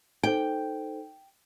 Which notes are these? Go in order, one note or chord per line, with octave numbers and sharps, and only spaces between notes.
D#4 A4 C5 G5